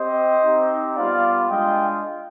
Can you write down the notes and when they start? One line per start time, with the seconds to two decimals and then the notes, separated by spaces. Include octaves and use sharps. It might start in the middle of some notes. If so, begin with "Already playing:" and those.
Already playing: C4 G4 C5 D#5
0.43 C4 D#4 G4
0.96 G3 B3 F4 D5 F5
1.50 G#3 D4 F4 D#5 G5